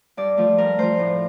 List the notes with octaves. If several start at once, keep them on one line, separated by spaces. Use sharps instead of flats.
G2 D5
F3 A3
G2 A#4
F3 A3 C5
A2